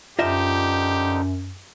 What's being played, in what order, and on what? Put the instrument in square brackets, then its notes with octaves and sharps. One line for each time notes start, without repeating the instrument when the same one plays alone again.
[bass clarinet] F#2 [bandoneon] D3 F3 D#4 [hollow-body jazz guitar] F4 D#5 E5 [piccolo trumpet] G4